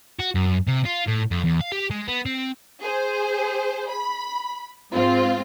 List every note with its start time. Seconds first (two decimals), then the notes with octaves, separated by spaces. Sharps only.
0.20 F#4
0.35 F#2
0.67 C3
0.86 F4
1.07 A2
1.31 F2
1.44 E2
1.60 F5
1.72 G4
1.90 G#3
2.08 B3
2.26 C4
2.80 G#4 C5
3.90 B5
4.93 G#2 C4 F4